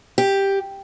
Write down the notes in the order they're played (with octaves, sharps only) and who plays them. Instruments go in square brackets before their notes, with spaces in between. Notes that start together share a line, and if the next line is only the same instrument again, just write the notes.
[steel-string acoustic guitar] G4